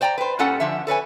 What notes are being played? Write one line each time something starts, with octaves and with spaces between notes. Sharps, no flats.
C5 D5 G5 A5 A#5
B4 C5
A#2 G3 C#4 F4 A4 F#5
D3 F3 D4 E5
A4 B4 C#5 G#5